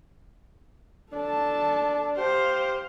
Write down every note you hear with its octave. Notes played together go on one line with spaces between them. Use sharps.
D4 A4 A5
G4 C5 F5